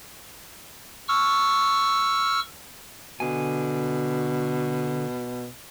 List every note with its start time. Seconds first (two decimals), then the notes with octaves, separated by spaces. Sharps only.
1.08 C#6 E6 F6
3.20 B2 D3 G#5